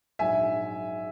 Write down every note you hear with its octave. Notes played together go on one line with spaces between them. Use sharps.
A#1 G#2 F#3 E5 G#5